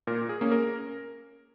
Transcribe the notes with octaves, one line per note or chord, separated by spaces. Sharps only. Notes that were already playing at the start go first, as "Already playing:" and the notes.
A#2 A#4
G#4
A#3 C#4
A#4